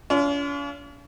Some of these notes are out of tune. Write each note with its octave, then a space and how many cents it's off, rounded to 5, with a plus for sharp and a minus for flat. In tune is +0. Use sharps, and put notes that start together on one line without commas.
C#4 +45 F4 -25